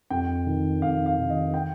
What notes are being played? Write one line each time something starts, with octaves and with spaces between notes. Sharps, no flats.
F2 G5
D#3
F2 F5
F5
D#3
D#5
G5